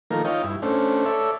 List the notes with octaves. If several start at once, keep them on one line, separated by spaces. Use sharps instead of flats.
D#3 F3 A3 A#3 A#4
D#4 F4 C#5 D#5 G5
G2 E4
A3 C#4 D4 C5
A4 C#5 D5 E5